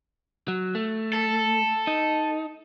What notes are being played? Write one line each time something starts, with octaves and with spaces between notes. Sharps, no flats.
F#3
A3
A4
D#4